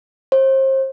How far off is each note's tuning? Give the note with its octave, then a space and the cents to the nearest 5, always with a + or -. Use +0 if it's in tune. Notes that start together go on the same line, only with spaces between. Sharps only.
C5 +35